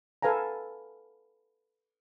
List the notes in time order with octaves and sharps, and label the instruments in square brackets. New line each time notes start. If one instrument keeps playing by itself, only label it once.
[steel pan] A4 B4 F5 G#5 A#5